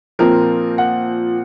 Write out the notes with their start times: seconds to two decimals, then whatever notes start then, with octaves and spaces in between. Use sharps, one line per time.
0.19 A#2 F3 C4 A#4
0.78 F#5